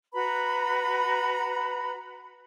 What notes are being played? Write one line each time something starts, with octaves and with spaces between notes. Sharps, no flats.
F#4 B4 A#5 B5